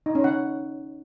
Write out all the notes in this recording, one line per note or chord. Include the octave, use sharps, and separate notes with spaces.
D#4
C#4
F#5